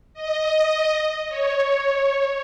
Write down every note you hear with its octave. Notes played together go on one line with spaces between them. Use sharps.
D#5
C#5